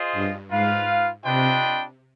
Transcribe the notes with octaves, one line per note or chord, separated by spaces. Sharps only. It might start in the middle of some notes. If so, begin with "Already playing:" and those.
Already playing: F4 G#4 C5 D#5
G2
G#2 F4 B4 F5
C3 D4 F4 B4 D#5 G5